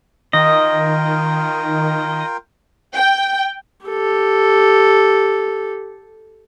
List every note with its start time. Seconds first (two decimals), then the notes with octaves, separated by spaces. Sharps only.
0.33 D#3 F4 A#4 D#5 G5
2.96 G5
3.86 G4 A4